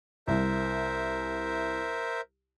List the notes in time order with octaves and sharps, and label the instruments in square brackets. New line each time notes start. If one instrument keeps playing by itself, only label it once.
[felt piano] C2 [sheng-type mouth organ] A#4 C5 E5